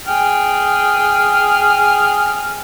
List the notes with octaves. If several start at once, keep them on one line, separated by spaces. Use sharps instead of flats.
G#4 G5 F6